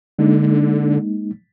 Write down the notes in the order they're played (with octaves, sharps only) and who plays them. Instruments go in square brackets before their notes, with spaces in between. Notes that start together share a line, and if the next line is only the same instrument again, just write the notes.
[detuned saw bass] D3 [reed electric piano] G#3 A#3 D#4